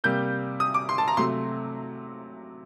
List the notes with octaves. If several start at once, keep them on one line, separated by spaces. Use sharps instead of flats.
C3 G3 A#3 G6
D#6
D6
C6
A5
A#5
C3 F#3 A3 C6